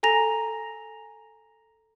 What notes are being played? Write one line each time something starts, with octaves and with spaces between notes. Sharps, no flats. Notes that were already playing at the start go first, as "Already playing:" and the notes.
A4 G#5 A#5 A#6 F7